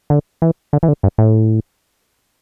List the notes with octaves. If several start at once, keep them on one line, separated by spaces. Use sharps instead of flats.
D3
E3
D3
E3
D3
G2
A2